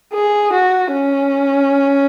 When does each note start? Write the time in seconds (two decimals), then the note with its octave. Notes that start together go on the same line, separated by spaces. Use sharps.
0.14 G#4
0.53 F#4
0.92 C#4